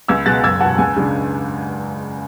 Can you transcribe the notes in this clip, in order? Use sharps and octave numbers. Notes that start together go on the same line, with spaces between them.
C#2 E6 G#6
B2 G#3 B3 F#6 A6
F#1 E6 G#6
E2 F#5 A5
B2
C#2 G#5
C#3 G#3 D4